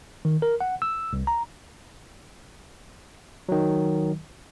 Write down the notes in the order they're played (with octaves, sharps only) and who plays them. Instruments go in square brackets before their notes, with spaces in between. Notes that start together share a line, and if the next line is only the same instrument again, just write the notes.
[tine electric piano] D#3
A#4
F#5
E6
C2
A#5
D#3 F#3